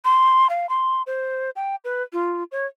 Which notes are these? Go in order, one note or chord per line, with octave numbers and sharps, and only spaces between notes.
C6
F5
C6
C5
G5
B4
F4
C#5